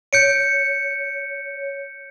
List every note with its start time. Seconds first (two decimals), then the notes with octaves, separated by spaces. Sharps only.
0.13 C#5 G6 C#7 D7